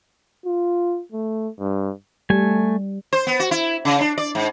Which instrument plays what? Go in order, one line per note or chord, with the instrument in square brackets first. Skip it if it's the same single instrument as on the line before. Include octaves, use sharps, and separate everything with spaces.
[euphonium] F4
A3
G2
[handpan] G3 [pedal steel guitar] A3 G#5
[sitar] C5
B3
F#4
E4
C#3
D4
D5
G#2